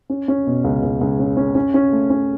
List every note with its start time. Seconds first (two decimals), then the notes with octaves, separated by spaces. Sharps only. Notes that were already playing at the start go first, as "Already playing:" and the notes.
0.10 C#4
0.28 C#4
0.47 B2
0.64 C#2
0.83 C#2
1.01 C#2
1.19 C#4
1.37 C#4
1.55 C#4
1.74 C#4
1.92 A3
2.10 C#4